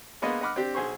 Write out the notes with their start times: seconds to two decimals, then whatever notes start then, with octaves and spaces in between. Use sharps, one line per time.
0.22 G#3 A#3 B3 B4 D#5 C6
0.41 D#5 F#5 B5 D6 F6
0.56 C4 D4 G4
0.74 B1 G#4 C5 C6 C#6